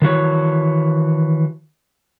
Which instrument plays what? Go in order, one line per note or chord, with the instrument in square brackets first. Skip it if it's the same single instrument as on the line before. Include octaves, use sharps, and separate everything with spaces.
[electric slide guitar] D#3 E3 F#4 C#5